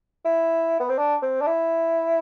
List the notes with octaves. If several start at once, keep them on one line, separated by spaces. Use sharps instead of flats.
E4
B3
C4
D4
C4
D4
E4